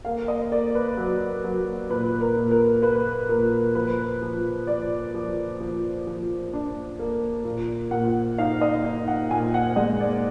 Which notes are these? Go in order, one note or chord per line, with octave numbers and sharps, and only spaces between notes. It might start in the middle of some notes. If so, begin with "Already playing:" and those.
A#3 F5
D#5
A#3 D5
B4
F#3
F#3
A#2 B4
A#4
A#2
A#4
A#3 B4
A#2 A#4
F3 B4
F3
F3 D5
F3
F3
F3
D4
A#3
A#2
A#2 F#5
D#4 F5
D#5
D#4
F#5
A#2 G#5
F#5
G#3 D#5
D5